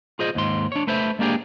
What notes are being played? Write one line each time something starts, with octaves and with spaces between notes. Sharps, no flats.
F4 G#4 C5 D#5
D#2 G#2 C6
D4 C#5
A3 B4 C5 E5
G#3 A#3 D4 G4 G#4